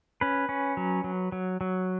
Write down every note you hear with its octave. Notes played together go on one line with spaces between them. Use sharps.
C#4 B4
C#4
F#3
F#3
F#3
F#3